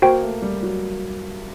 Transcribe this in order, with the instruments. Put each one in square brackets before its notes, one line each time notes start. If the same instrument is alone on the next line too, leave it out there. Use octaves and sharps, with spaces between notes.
[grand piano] A#3 [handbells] F#4 C5 G5
[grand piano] A3
G3
F#3